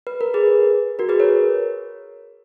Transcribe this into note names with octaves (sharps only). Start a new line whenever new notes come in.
B4
A#4
G#4 B4
F#4 A#4
G#4 B4
A#4 C#5